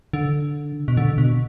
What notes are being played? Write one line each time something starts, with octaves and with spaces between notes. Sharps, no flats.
D3
B2
D3
B2